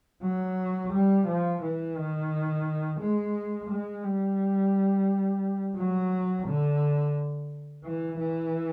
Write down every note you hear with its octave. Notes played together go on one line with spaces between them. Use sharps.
F#3
G3
F3
E3
D#3
G#3
G#3
G3
F#3
D3
E3
E3